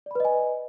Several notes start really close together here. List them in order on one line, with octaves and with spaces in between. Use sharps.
D5 B5 B4 D#5 G#5